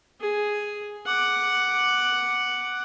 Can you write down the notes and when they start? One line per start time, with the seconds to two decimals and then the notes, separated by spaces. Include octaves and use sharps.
0.21 G#4
1.07 F#5 D6